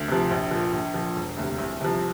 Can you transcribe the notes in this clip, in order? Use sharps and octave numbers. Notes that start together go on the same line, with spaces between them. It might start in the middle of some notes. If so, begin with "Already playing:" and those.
Already playing: D2
C3 F3
A#1
A#2 F3
A#1
A#2 F3
E1
D2 C3
C2
C3 F3